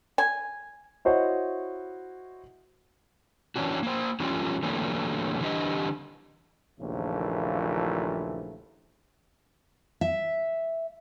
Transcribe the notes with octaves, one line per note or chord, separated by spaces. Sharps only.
G#5
E4 F#4 C5 C#5 D#5 F#5
E3 C#4 D4 F#4
A#3 C5
E3 F#3 G3 A3 C#4 F4
D3 E3 F#3 G3 A3 A#3
D3 E3 G3 D4 G4 D#5
A#1 D#2 C#3 E3 F3 A3
E5